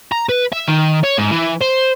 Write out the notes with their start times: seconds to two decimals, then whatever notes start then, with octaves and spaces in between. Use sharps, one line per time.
0.12 A#5
0.29 B4
0.52 E5
0.68 D#3
1.04 C#5
1.18 G#2
1.31 E3
1.61 C5